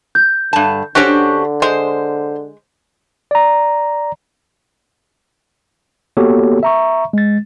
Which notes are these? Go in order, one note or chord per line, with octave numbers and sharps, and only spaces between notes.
G6
G2 D3 A5
D3 C#4 D4 F#4 G4 C5
G#3 C5
D5 A#5
A#3 B3 F#4 G4 A4 C#5
E5 A#5 C#6
G#3 A6